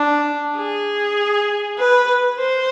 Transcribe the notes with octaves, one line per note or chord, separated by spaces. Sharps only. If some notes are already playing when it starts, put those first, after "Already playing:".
Already playing: D4
G#4
B4
C5